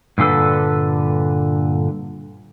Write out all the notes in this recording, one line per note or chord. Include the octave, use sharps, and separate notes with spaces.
G2 A#2 D3 A4 B4